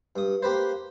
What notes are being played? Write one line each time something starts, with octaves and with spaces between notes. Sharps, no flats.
G2 D#6
A#3 G4 B4 C5